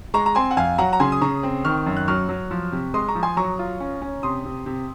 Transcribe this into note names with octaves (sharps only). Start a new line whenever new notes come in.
G#3 A#5 C#6
A#5
C4 G#5 C6
F#5
F2 F5 G#5
F#3 F#5 A#5
A#5
C#3 G#5 C6
D#6
C#3 A#5 C#6
C4
D#3 C#6 F6
F#2
F#6
F#3 C#6 F6
F#3
F3
C3
G#3 C6 D#6
A#5 C#6
F3
G#5 C6
F#3 A#5 C#6
F4
C#4
C#4
C3 C6 D#6
C3
C3